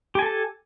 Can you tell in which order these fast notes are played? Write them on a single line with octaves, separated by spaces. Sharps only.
G4 G#5 A4 A5